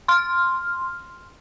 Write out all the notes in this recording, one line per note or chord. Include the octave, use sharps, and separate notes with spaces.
C6 F6